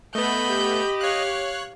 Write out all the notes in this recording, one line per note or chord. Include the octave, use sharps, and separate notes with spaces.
A3 B3 D#5 B5 G6
G4
C#5 F5 F#6